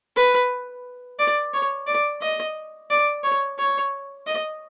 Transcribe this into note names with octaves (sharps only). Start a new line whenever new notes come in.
B4
D5
C#5
D5
D#5
D5
C#5
C#5
D#5